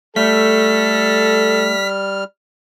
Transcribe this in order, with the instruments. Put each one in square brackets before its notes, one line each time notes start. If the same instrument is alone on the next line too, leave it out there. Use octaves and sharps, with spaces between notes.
[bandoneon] G3 F6 [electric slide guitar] A3 [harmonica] A4 [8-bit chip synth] B6